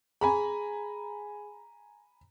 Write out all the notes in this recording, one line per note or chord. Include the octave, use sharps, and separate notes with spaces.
G#4 G#5 A#5 B5